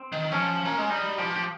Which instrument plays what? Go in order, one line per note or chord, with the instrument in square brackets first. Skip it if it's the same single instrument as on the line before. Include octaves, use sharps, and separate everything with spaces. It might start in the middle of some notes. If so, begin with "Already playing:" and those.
Already playing: [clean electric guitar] C4
[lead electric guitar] D#3
[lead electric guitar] F3 [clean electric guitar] C#4
[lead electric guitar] A#3
G#3
[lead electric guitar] G3 [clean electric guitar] D#4
[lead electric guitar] F3 [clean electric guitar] G4
[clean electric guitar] G4